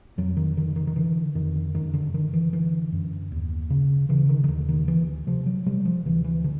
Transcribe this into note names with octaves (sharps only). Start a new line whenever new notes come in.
F2 F#3
D#3
D3 D#3
D#3
D#3
D3 E3
F2 D#3
F#2 D#3
D3
D3 D#3
E3
D3 E3
F#2
D#2
C#3
C#3 E3
D#3
D#3
D#2 D3
D#3
D2 E3
C3 F3
F#3
C3 G3
F3
D2 E3
E3
D3